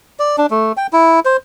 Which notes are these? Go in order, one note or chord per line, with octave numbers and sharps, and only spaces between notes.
D5
D4
A3
G5
E4
C5